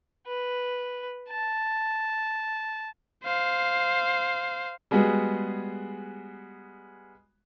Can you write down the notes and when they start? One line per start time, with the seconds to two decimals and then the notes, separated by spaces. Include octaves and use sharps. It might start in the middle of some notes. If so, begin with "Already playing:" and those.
0.27 B4
1.29 A5
3.24 C5 F5
4.91 G3 G#3 B3 F#4 G#4